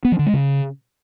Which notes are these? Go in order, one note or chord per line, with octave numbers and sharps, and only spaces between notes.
B3
F3
D3
G#3
C#3